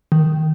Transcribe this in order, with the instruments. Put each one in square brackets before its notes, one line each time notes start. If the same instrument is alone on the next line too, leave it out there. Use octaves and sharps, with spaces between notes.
[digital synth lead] D#3